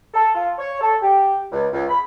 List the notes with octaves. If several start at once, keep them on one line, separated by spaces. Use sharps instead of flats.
A4
F4
C#5
A4
G4
C#2
C#2
B5